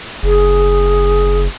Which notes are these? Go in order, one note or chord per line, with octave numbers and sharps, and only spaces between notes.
F#1 G#4